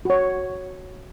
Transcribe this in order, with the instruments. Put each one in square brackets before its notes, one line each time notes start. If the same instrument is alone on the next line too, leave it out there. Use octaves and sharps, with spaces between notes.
[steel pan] F#4 C#5